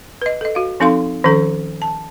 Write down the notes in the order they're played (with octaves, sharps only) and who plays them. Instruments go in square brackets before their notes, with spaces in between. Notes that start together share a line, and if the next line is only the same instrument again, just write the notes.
[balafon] B4 D#5
A4 D#5
F#4 F5
F3 C4 D#4 A4 F5 C6
D#3 F3 C#4 A4
A5